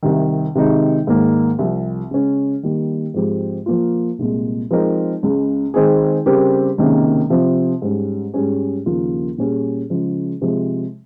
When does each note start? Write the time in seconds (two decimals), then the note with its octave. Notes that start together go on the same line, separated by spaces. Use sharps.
0.03 C2 C3 D#3
0.55 C3 D#3 G#3 D#4
1.07 G#2 D#3 A#3
1.59 C2 C3 F3
2.11 C#3 G#3 C#4
2.63 D#3 G3 A#3
3.14 G#2 F3 G#3 C4 G4
3.66 F3 A#3 F4
4.19 C2 A#2 G#3
4.71 F3 G#3 C4 D#4 A#4
5.23 C#2 C#3 G#3
5.74 D#3 G#3 C4 D#4 G#4
6.26 C#3 G3 C4 G4 A#4
6.78 C#2 C3 D#3 A#3 C#4
7.30 C3 F3 C4
7.82 G#2 G3 C#4
8.34 G#2 G3 C#4 G#4
8.86 D#2 C#3 F3 A#3 F4
9.38 A#2 G3 C#4 G#4
9.90 C#3 F3 G#3
10.41 C3 F3 G#3